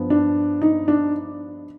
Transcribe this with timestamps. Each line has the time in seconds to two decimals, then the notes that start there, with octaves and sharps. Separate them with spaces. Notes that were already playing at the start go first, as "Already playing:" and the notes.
Already playing: G2 F3 B3
0.10 D4
0.62 D#4
0.88 D4